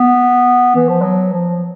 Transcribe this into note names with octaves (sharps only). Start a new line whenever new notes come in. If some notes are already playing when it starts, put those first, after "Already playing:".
Already playing: B3
E3
F3
F#3
F3